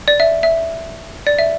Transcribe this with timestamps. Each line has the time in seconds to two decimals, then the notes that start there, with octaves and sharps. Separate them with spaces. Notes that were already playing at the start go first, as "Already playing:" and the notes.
0.08 D5
0.20 E5
0.43 E5
1.27 D5
1.39 E5